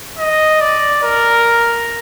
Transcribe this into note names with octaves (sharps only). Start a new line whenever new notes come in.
D#5
D5
A#4